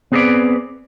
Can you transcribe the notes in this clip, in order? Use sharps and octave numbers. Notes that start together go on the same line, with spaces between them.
B3 C4 G#4 A#4 B4 D5